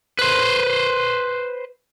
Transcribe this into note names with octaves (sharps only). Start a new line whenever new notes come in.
B4 C5